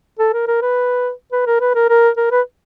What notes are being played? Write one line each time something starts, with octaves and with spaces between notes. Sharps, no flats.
A4
A#4
A#4
B4
B4
A#4
B4
A#4
A#4
A#4
B4